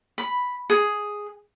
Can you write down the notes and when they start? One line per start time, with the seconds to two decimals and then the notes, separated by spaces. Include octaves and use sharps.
0.18 B5
0.70 G#4